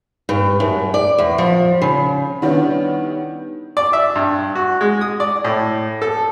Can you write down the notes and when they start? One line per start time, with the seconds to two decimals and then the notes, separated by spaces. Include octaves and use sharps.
0.29 G2
0.60 F#2
0.94 D5
1.18 E2
1.38 F3
1.82 C#3
2.42 D#3 G3 B3 C#4 D4 E4
3.77 D5
3.93 E5
4.16 G2
4.55 F#4
4.81 G#3
5.01 D#6
5.20 D5
5.45 A2
6.02 A4